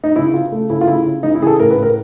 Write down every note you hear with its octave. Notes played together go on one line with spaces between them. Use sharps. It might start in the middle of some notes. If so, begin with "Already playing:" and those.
D#4
C#3 E4
C#3 F4
A3
C#3 E4
F4
C#3 E4
C#3
E3 D#4
E4
C#3 G#4
A4
A2 A#4
B4
A2
A#4